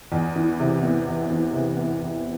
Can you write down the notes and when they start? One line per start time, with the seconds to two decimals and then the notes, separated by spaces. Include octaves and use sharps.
0.12 E2
0.36 E3
0.60 C3
0.83 B3
1.07 E2
1.30 E3
1.53 C3
1.77 B3
2.01 E2